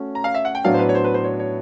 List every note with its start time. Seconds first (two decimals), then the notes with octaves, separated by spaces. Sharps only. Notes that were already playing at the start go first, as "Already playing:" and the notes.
Already playing: A3 C#4 F#4
0.15 A#5
0.24 F5
0.35 E5
0.45 F#5
0.55 G5
0.64 A2 F#3 B3 D4 F5
0.74 C5
0.79 B4
0.89 C#5
0.95 C5
1.05 B4
1.14 C5
1.24 C#5
1.40 C#5